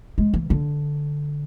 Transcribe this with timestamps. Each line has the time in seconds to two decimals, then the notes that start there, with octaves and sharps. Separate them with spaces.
0.18 G#3
0.34 E3
0.50 D3